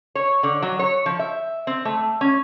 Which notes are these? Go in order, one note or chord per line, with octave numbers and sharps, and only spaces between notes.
C#5
D3
F#3
C#5
F3
E5
C4
A3
C#4